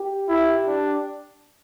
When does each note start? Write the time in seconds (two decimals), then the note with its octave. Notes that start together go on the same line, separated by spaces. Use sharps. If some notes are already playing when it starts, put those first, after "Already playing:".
Already playing: G4
0.29 E4
0.67 D4